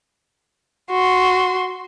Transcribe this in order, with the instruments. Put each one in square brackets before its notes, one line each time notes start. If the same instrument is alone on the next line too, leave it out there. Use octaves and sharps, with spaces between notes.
[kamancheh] F#4 C6